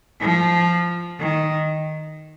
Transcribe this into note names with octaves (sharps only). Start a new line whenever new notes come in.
F3
D#3